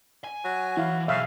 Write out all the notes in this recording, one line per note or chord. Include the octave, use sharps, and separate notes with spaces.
G#5
F#3
E3 E4 F5
B1 C#3 E5 F5